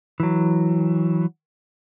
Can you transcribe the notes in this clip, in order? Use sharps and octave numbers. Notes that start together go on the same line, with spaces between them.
E3 F#3